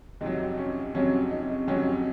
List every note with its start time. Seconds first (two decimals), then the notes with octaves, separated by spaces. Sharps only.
0.21 F2 C3 F#3 D#4
0.57 C#4
0.94 F2 C3 F#3 C#4
1.31 D#4
1.68 F2 C3 F#3 C#4